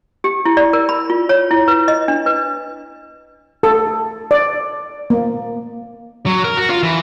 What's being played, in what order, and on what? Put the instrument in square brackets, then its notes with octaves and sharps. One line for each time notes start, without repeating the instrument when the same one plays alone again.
[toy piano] G4
E4
D5
A#4
B5
F4
C#5
E4
B4
D#5
D4
B4
[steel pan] A4
D5
A#3
[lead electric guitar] F#3
A#4
F#4
F4
E3